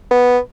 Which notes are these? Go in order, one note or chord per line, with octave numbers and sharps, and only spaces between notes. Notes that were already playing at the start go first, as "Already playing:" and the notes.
B3